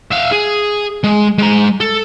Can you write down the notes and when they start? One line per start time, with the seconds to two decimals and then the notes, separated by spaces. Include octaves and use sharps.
0.11 E5 F5
0.32 G#4
1.04 G#3
1.38 G#3 A#5
1.80 A4